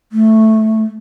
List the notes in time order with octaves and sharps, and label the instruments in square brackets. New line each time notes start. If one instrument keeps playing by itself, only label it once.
[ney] A3